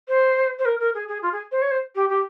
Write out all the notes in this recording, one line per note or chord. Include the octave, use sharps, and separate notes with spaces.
C5
C5
A#4
A#4
G#4
G#4
F4
G#4
C5
C#5
C5
G4
G4